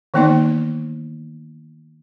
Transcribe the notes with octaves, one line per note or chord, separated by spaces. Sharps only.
D#3 E3 A#3 B3 D#4 D5